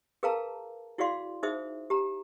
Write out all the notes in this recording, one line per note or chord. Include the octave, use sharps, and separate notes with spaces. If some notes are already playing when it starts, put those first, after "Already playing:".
G#4 A#4 B4 F5 A5 A#5
E4 F#4 G#4 D5 F5 C6
D#4 G#4 C5 E5 D#6
G4 A#5